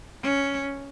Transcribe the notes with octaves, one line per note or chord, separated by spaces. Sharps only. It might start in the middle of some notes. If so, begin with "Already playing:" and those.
C#4